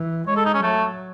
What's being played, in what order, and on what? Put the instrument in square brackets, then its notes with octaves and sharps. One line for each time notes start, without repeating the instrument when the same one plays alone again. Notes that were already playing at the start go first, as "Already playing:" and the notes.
Already playing: [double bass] E3
[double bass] G#3 [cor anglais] C#5
[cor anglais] A4
D#4
C#4
[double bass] F#3 [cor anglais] A3